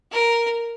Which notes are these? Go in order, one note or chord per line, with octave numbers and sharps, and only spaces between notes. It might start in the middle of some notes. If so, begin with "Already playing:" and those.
A#4